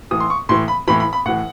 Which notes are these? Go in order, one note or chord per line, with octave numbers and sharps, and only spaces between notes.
A2 E3 D#6
C6
C#6
A2 E3 C6
B5
A2 E3 B5
B5
B5
A2 E3 F#5